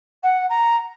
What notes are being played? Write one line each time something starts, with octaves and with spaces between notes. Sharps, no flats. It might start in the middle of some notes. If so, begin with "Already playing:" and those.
F#5
A#5